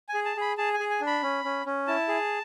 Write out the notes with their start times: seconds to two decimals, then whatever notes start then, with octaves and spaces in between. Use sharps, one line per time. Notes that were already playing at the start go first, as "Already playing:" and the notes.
0.09 G#5
0.14 G#4
0.25 A5
0.37 G#4 B5
0.58 G#4 A5
0.73 G#5
0.80 G#4
0.90 G#5
1.01 D4
1.07 B5
1.23 C#4
1.44 C#4
1.66 C#4
1.87 E4 A5
2.08 G#4